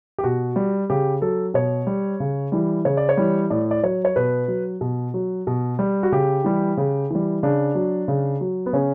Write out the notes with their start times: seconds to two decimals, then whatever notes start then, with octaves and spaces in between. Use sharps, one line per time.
0.18 G4
0.24 B2 F#4
0.56 G3
0.90 C#3 G4
1.22 F#3 A4
1.54 B2 C#5
1.87 G3
2.20 C#3
2.52 E3 G3
2.85 C#3 C#5
2.97 D5
3.09 C#5
3.17 E3 G3
3.50 A2 D5
3.71 D5
3.83 F#3 C#5
4.05 C#5
4.16 B2 B4
4.48 F#3
4.81 B2
5.14 F#3
5.47 B2
5.79 G3
6.03 F#4
6.12 C#3 G4
6.44 E3 G3
6.77 C#3
7.10 E3 G3
7.43 C#3 D4
7.75 F#3
8.08 C#3
8.41 F#3
8.66 B3
8.73 C#3 C#4